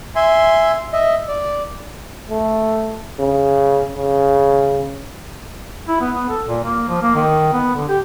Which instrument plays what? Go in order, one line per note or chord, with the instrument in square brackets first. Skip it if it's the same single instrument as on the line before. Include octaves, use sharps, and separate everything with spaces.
[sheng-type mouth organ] E5 G#5 C6
D#5 E5
D5
[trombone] A3
C#3
C#3
[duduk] E4
B3
B3
A4
A#2
A#3
F3
A#3
D#3
B3
D3
G4